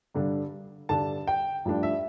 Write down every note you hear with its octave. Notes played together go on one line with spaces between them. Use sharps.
G2 D3 G3 D4
G2 D3 G3 D4 A5
G5
G2 F3 A3 D4
E5